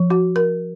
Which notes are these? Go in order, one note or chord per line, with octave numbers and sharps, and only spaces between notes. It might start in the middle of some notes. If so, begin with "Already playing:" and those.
Already playing: F3
F#4
A#4